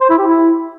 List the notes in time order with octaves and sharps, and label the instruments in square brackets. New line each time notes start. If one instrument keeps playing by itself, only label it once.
[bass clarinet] C5
E4
G4
E4